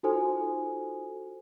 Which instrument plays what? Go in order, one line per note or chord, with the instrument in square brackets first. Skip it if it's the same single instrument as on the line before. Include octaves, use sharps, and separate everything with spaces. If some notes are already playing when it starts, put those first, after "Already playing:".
[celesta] D#4 F4 F#4 A4 C5 G#5